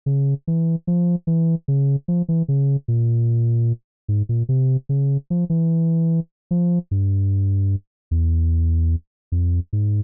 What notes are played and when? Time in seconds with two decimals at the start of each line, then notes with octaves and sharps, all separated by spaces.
0.06 C#3
0.47 E3
0.87 F3
1.27 E3
1.68 C#3
2.08 F3
2.29 E3
2.48 C#3
2.88 A#2
4.08 G#2
4.29 A#2
4.49 C3
4.89 C#3
5.30 F3
5.50 E3
6.51 F3
6.91 G2
8.11 E2
9.32 F2
9.73 G#2